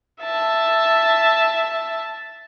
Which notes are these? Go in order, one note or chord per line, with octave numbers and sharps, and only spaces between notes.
E5 A5